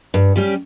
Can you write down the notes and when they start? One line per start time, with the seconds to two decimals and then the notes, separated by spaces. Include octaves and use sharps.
0.14 G2
0.36 G3 C#4 G4